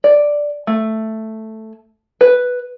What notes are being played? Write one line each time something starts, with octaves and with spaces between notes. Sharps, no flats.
D5
A3
B4